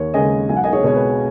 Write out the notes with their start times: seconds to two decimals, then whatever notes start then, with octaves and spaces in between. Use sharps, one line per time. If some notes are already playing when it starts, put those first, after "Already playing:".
Already playing: D#2 C#5
0.14 C#3 G#3 D#5 G#5
0.49 B1 G#5
0.56 F#5
0.64 D#5 G#5
0.73 G#4 C#5
0.84 B2 G#3 C#5
0.96 B4